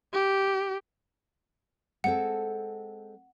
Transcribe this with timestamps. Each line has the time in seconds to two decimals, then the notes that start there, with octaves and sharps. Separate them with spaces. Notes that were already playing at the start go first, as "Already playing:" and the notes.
0.13 G4
2.04 G#3 C4 A4 F#5